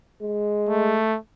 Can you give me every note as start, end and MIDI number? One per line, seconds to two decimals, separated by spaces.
0.22 0.99 56
0.69 1.17 57